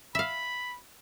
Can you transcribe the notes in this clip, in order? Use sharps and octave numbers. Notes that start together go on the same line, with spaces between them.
E5 F5 B5